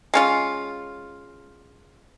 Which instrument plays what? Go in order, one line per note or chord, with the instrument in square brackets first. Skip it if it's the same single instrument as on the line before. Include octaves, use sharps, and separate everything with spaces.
[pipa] G#3 C#4 F4